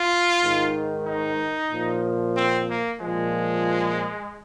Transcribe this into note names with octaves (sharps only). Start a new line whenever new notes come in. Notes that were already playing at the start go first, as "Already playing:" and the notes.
Already playing: F4
G#2 D#3
D#4
A#2 F3
C4
A#3
A#2 F3 G#3